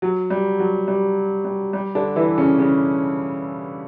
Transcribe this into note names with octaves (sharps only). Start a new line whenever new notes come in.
F#3
G3
F#3
G3
G3
G3
D3 D4
E3 E4
C#3 C#4
C#3 C#4